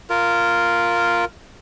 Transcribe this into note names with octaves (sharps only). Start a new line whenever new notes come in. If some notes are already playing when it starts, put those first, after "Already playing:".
F4 A#4